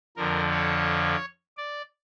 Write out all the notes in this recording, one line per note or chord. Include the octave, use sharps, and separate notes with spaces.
F2 D3 F3 A#4
C#5
D5